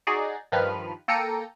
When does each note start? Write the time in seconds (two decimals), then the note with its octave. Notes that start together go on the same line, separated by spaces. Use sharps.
0.07 D#4 F#4 G#4 D5
0.52 G2 D#3 F3 B4 F6
1.08 A#3 A4 G5 A#5 C#7 D#7